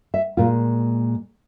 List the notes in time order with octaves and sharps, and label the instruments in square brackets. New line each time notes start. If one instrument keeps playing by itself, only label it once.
[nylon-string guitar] E5
A#2 G#3 F4